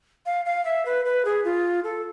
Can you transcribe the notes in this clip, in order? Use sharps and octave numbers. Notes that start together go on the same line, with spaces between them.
F5
F5
E5
B4
B4
G#4
F4
A4